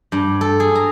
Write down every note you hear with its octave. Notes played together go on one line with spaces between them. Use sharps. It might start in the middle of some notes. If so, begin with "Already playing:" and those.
G2
A4
G#4
A#5